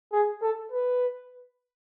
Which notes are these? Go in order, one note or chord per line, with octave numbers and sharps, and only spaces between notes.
G#4
A4
B4